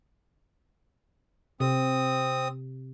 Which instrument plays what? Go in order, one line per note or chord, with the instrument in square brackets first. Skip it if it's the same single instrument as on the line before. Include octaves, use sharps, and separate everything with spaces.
[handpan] C3 [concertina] C4 D#6